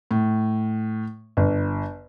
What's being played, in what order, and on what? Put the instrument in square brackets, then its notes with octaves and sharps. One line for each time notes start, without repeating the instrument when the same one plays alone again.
[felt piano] A2
G1